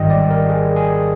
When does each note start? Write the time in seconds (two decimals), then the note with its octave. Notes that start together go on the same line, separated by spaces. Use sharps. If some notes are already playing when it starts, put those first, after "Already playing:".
Already playing: G#1 G#2 D#3 G3 D#5 G5
0.10 D5
0.30 A#4
0.49 G#4
0.76 G#4